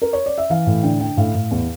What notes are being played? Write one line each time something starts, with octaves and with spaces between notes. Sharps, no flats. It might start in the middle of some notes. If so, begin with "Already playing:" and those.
A#4
C#5
D5
E5
E3 F5
A2
D3 G5
D3 G5
A2 F5
A2
E2